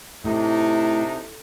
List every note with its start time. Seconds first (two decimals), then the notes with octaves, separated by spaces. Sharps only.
0.24 A2 C3 D4 D#4